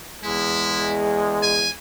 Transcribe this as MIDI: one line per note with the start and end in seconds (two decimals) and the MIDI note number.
0.24 1.66 40
0.24 1.66 56
0.24 0.97 64
1.42 1.70 80